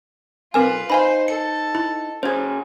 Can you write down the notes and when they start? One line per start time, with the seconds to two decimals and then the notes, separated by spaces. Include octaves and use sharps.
0.54 B1 C4 F4 A#4 B4 G#5
0.90 D#4 C5 F5 G#5 B5
1.28 A4 C#7
1.75 E4
2.23 C#4 F#4 G#4 C5 G#6